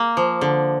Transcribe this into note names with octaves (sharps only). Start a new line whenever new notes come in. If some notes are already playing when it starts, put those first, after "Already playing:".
Already playing: A#3
F3
D3